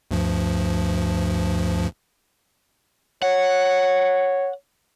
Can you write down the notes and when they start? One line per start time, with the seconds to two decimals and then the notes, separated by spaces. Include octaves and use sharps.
0.11 D2 G2 F3
3.22 C#5 F#5